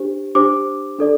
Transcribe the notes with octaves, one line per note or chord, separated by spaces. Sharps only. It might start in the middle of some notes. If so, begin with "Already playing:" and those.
Already playing: D4 G4 C5
D4 G4 C5 D6
D4 A4 D5